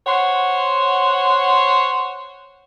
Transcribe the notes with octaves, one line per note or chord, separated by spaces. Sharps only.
C5 C#5 F#5